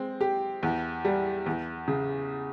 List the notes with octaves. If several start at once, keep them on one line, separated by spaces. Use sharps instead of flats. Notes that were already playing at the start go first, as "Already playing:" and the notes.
Already playing: G#3 C4
G4
E2
G3
E2
C#3